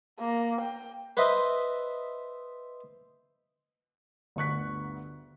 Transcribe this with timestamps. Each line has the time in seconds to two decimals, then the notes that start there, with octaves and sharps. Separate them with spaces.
0.19 A#3
0.61 G5
1.17 B4 C5 D#5 E5
4.36 G1 D2 C#6 F#6 B6